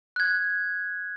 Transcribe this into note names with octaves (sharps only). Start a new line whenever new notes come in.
F#6 G#6